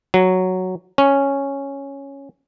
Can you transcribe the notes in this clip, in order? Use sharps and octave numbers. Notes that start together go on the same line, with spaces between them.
F#3
C#4